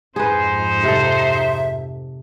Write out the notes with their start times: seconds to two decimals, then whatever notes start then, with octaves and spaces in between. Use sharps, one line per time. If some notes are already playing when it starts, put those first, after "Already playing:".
0.16 F2 G#2 D#4 G#4 B4 C5
0.83 C3 A4 E5